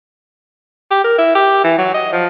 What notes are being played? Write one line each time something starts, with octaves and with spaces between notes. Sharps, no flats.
G4
A#4
E4
G4
E3
F#3
D#5
F3